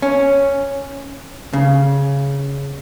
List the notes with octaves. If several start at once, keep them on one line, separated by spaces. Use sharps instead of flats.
C#4
C#3